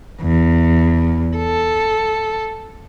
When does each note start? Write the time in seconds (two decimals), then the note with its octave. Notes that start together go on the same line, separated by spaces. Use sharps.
0.20 E2
1.37 A4